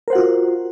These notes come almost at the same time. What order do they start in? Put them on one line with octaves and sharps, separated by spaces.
A#4 C5 F#5 F#4 F4